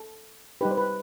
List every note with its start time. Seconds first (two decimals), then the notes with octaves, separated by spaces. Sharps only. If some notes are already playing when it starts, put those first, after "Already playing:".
Already playing: A4
0.61 G3 D#4 G4 B4
0.71 C5
0.77 B4